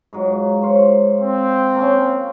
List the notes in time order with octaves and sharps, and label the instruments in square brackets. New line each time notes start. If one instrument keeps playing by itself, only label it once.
[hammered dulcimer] G#2 F#3 F4
F4 C5 C#5
[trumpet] C4
[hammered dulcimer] A#3 C#4